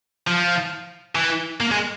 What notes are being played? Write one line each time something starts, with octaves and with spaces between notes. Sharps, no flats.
F3
E3
A#3
G#3